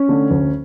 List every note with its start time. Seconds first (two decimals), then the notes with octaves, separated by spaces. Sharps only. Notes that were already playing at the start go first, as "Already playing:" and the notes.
Already playing: C#4
0.08 D3 A3
0.31 D2